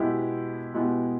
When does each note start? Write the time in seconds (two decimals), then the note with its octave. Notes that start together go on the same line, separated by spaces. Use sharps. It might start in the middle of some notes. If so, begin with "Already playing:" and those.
Already playing: B2 G#3 B3 E4 G4
0.74 B2 G#3 B3 E4 G4